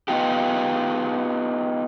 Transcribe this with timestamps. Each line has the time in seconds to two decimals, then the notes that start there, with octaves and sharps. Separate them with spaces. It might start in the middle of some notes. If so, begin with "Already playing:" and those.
0.08 B3 D#4 F4 G4